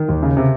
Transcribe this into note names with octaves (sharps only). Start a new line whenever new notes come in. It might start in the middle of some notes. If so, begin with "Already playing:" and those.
Already playing: D#3
D#2
C#3
C3